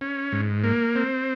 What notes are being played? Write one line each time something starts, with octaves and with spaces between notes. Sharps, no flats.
C#4
G#2
A#3
C4